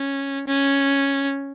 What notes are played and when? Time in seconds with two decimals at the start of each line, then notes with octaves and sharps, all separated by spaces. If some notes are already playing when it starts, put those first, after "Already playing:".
Already playing: C#4
0.48 C#4